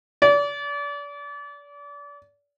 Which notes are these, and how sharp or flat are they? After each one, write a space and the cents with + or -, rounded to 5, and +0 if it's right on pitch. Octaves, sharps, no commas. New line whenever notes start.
D5 -35